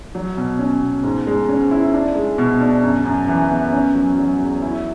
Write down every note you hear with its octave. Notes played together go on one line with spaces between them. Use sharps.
F#3
B2
C#4
B2
G#2
G#3
C#4
E4
D4
G#3
B2
D4
F#2
F#2
E3
B3
C#4
F#3
F#3
E2
E4